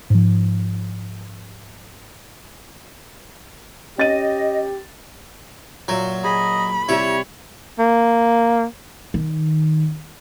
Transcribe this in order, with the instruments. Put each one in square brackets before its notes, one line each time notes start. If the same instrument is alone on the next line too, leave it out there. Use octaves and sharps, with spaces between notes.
[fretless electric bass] G#2 F3
[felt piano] C#4 A6 D#7 [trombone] G4 [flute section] D#5
[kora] A#2 E5 F5 [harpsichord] F#3
[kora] G#4 [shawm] D#5 [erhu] B5
[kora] C3 G3 E5 [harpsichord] E4 [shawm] C#5
[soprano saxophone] A#3
[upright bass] D#3